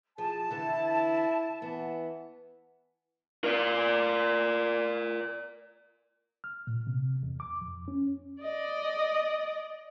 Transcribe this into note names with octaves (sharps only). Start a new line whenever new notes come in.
F3 G#4 A5
D3 E3 E4
E3 B3
A#4 D5
F6
A#2
C3
E2
D6
F2
C#4
D5 D#5